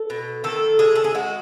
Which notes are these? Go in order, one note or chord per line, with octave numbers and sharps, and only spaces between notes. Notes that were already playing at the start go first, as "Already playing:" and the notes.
Already playing: A4
B2
D#3 A4
G#3 G#4
A4
G#4
G#3 F#4